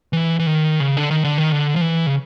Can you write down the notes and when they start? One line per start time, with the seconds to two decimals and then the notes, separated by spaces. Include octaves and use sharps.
0.13 E3
0.39 E3
0.46 D#3
0.80 C#3
0.97 D3
1.11 D#3
1.24 D3
1.38 D#3
1.52 D3
1.76 F3
1.81 E3
2.07 C#3